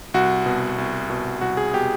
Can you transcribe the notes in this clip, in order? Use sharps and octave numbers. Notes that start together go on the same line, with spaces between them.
C2 F#4
B2
C2
B2
C2 F#4
G#4
B2 G4